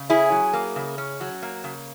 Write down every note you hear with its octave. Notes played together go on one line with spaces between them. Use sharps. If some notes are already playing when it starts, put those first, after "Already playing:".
Already playing: C#3
C#4 E4 G#4
F#3
A#3
C#3
C#4
F#3
A#3
C#3